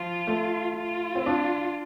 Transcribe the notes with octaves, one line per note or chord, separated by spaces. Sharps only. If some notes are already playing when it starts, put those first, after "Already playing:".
Already playing: F3 F4
A3
F4
C4
D4